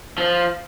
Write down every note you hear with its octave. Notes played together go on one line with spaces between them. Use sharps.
F3